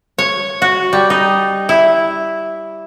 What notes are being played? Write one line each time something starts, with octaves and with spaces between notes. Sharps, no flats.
C#5
F#4
G3
D#4
E4